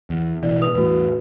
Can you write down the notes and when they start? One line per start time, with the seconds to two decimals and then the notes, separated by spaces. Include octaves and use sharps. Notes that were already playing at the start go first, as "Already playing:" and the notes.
0.10 E2
0.43 A1 B2 E3 D5
0.61 B4 D#6 F7
0.74 E2 A2 F#4 B4